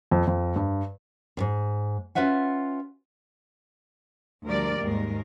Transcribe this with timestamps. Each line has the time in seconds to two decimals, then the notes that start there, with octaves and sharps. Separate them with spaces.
0.11 F2
0.27 F2
0.56 G2
1.37 D#2 G#2
2.15 C#4 D#4 F4 B4 E5 F#5
4.45 D2 F3 G3 A#4 D5
4.82 D#2 G#2 G#3 A#4